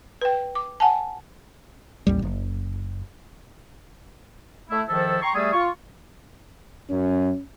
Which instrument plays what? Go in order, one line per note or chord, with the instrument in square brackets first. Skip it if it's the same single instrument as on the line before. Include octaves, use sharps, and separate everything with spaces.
[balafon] B4 G5
D6
F#5 G#5 A5
[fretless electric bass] A1 D#2 G3
F#1
[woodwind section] A3 E4
G#2 D#3 F3 E4 A4
G5 A#5 C6 C#6
G3 A3 G#4
F4 C#6
[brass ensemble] F#2 [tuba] C#4